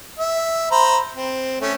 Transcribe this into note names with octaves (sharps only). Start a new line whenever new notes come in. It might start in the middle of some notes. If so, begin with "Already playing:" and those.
E5
C5 A#5 B5
C4
A3 C#4